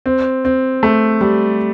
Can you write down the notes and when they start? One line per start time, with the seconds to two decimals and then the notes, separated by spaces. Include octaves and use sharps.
0.06 C4
0.45 C4
0.83 A3
1.21 G3